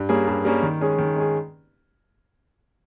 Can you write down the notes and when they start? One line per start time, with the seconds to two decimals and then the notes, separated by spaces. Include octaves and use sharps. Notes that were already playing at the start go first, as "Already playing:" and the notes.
Already playing: G2
0.09 G3 A#3 C#4 G#4
0.28 G2
0.45 G3 A#3 C#4 G#4
0.63 D#3
0.81 G#3 C#4 G#4
0.99 D#3
1.16 G#3 C#4 G#4